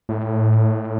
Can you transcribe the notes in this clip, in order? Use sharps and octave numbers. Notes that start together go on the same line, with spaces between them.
A2